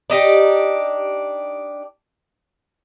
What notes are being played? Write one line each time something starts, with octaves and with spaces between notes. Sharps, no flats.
D4 D#4 G4